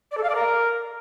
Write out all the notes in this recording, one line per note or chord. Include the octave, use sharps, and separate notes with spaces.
D5
A4
F5
D5
A#4